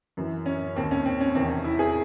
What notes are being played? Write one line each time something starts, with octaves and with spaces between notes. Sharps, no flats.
F#2 E3
C#4
D#2 D#3 C4
C#4
C4
C#4
E2 C3 D#3 C4
C#4
E4
G#4